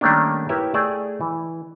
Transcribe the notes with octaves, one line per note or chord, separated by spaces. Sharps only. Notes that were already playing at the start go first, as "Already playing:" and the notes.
D#3 G3 A3 A#3 C#4 D4
E4 G4 A#4 B4 C#5 E5
A3 G#4 D5 G5 A5
E3